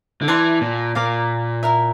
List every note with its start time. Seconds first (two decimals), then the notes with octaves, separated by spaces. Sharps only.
0.22 D3
0.28 E3 D5 A5 C6
0.61 A#2
0.95 A#2 A#4 D5 F5
1.63 E4 A#4 E5